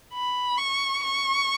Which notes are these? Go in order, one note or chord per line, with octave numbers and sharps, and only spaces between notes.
B5
C#6
C#6